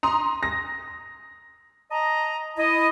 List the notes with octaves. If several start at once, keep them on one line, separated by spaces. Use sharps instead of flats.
A#5 C6 D#6
A#6
D#5 A5 A#5
E4 D#5